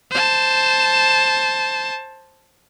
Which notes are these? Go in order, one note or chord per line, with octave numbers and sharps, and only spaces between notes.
C5 A5